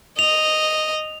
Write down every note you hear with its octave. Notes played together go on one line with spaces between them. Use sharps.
D#5 F7